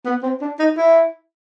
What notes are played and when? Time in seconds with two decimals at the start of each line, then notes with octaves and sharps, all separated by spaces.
0.05 B3
0.23 C4
0.41 D4
0.59 D#4
0.77 E4